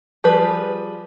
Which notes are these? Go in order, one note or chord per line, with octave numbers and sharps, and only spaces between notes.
F3 G3 G#4 B4